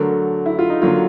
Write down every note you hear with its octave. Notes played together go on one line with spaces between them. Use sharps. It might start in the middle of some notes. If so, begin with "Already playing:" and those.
Already playing: D3 F#3 A3 A#4
E4
F4
D#4
D3 F#3 A#3 F4